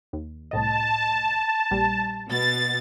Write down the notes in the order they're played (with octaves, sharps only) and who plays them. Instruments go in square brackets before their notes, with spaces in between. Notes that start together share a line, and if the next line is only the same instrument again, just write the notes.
[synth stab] D#2
[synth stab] C2 A2 D#5 [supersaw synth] A5
[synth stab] A#1 G3
[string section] B2 A6